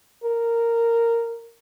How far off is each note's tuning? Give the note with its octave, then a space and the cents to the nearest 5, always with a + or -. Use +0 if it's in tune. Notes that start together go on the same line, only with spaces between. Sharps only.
A#4 -10